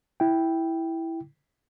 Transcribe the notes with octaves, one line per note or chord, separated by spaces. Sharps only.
E4 G5